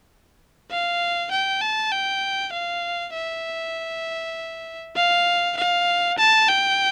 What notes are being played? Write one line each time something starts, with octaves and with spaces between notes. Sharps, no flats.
F5
G5
A5
G5
F5
E5
F5
F5
A5
G5